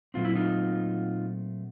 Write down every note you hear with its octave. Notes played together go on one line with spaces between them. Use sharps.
A#2 F#3 A3 C4 F4
E4
D#4 F4